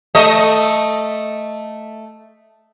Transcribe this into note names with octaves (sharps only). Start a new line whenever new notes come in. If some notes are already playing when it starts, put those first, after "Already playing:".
A3 D#5